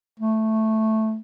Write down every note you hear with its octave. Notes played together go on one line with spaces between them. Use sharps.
A3